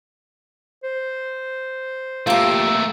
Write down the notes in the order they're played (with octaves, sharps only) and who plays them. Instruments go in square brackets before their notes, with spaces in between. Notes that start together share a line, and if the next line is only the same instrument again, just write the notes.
[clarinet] C5
[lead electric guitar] A3 A#3 [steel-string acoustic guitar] F4 G4 [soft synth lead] E6